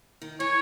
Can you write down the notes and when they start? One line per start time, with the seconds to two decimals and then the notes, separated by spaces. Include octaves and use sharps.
0.22 D#3
0.40 E3 C#5